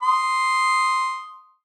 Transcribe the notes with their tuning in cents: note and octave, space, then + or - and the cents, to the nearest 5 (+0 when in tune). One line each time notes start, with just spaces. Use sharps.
C6 +0 D#6 +0